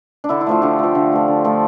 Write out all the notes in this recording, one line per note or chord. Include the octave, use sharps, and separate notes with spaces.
D4
D3 E4
E4
F3 A3 F4
D3 G4
F3 A3
D3
F3 A3
D3
F3 A3